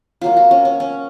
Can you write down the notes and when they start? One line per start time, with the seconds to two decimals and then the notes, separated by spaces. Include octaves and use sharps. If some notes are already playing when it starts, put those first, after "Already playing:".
0.21 C3 F#3 A#3 F4
0.37 F#4
0.51 C#4
0.65 C#4
0.80 C#4